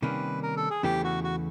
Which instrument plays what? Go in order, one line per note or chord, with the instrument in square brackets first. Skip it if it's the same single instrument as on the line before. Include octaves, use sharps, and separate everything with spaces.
[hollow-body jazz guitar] C3 D#3 G3 A#3 C#4 [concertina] B4
[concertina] A#4
A4
G#4
[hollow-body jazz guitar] E2 C#3 E3 A3 [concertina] G4
[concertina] F#4
F#4